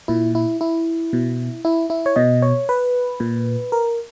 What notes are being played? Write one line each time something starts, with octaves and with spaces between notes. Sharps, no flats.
A#2 E4
E4
E4
B2
E4
E4
C#5
B2 D#5
C#5
B4
A#2
A#4